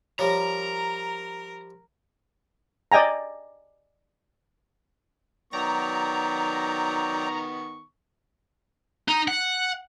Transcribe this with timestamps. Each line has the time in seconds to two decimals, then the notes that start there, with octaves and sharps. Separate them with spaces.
0.19 F3 G3 A#4 C#5 A#5
2.92 D5 D#5 G5 G#5 A#5
5.53 D#3 F#3 B3 D5 G5 A#5 C#6
9.08 D#4
9.28 F#5